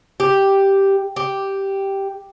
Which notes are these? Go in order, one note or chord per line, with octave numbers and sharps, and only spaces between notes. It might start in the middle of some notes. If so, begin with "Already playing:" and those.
G4
G4